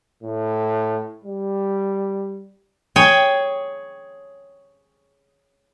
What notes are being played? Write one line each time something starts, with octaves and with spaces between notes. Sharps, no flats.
A2
G3
G#4 C#5 G5 G#5